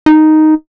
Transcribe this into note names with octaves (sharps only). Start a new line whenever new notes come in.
D#4